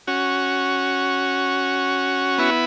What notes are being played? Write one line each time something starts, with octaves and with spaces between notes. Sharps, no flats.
C#4 F#4
B3 E4